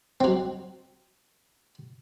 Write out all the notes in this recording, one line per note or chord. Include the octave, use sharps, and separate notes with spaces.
F#3 C4